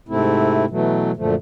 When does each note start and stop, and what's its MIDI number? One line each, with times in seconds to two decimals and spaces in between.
0.09 0.65 44
0.09 0.65 48
0.09 0.65 57
0.09 0.65 60
0.09 0.65 64
0.70 1.12 47
0.70 1.12 52
0.70 1.12 54
0.70 1.12 57
1.17 1.35 42
1.17 1.35 46
1.17 1.35 50
1.17 1.35 53
1.17 1.35 57